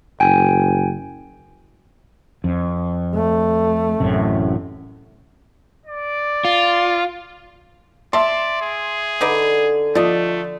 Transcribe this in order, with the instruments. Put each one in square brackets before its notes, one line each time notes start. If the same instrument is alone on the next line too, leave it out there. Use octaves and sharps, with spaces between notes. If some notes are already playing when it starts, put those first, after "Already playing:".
[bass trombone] F#1 [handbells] G5 G#5
[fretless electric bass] F2
[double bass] A3
[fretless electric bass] A1 F#2 C3
[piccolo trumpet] D5
[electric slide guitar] F4
[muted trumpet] D5 [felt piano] E5 C6 [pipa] A5
[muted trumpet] G#4
[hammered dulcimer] D3 [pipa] D#4 B4 D5
[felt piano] F3 [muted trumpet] A3 [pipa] D5 D#5